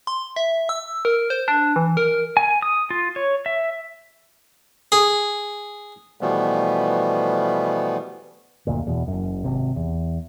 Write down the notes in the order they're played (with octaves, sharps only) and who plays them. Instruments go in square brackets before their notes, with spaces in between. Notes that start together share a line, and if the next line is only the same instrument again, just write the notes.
[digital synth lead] C6
E5
E6
A#4
C5
D4
E3
A#4
[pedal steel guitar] G#5
D#6
F4
C#5
E5
[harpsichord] G#4
[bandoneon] B2 E3 F3 G3 A3 B3
[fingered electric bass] F#1 D2 A#2
E2 B2
F#1 F#2
G#1 C3
E2